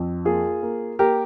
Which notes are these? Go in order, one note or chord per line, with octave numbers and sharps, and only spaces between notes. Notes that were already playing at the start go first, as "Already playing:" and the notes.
Already playing: F2
A#3 F4 G#4
A#3
A#3 G4 A#4